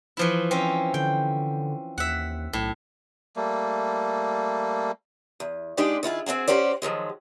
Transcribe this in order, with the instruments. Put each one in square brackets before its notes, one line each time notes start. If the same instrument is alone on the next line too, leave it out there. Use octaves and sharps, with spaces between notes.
[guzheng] E3 F3 E4
C4 C#4
[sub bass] D3 [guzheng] G5
[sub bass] D#2 [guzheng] E5 F#5
[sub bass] B1 [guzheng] A2
[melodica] G3 A3 A#3
[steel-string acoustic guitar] E2
G#3 D4 D#4 F4 G4 D5
D#3 E4 F4 G#4
C4 D4 F#4 G#4
C#4 F#4 G4 C5 D5
D#3 F3 F#3 G#3